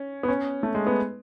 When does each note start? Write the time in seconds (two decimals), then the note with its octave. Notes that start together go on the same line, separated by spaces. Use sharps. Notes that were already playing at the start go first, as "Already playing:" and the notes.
Already playing: C#4
0.23 B3
0.28 C#4
0.63 A3
0.75 G#3
0.87 B3